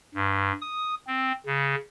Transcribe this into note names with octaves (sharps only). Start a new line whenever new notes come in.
G2
D#6
C4
C#3